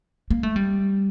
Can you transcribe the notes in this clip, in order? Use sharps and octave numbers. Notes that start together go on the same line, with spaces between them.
A#3
A3
G3